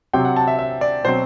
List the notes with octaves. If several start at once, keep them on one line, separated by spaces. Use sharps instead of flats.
C3 F#3 C4 G5
F#5
A5
E5
E5
D5
B2 F#3 C4 C5